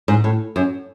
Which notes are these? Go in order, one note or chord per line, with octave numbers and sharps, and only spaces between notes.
G#2
A2
F#2